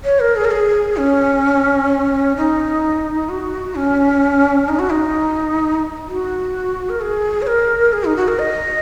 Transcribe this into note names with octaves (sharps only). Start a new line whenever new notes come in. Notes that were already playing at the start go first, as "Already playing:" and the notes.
C#5
A#4
G#4
A#4
G#4
C#4
D#4
F#4
C#4
D#4
F#4
D#4
F#4
A#4
G#4
C#5
A#4
G#4
D#4
F#4
A#4
D#5